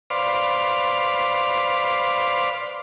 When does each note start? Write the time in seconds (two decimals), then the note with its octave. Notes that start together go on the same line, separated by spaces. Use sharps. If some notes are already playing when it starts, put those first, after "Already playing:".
0.10 B4 C5 D5 F5